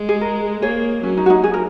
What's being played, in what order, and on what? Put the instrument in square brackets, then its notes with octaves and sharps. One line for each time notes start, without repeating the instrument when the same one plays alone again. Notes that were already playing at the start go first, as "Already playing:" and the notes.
Already playing: [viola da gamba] G#3
[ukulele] G#4
A#4
[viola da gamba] A#3 [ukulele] G#4 C#5
[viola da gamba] F#3 [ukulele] C#4
[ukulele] D#4
F#4
D#4
G#4
A#4